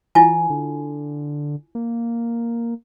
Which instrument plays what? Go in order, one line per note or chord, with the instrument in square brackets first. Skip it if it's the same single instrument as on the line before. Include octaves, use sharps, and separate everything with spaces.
[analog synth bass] E3 [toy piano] E4 F4 G#5
[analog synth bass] D3
A#3